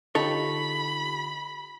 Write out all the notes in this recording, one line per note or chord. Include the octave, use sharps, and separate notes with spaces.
D3 D#4 F4 G4 A4 C#5 B5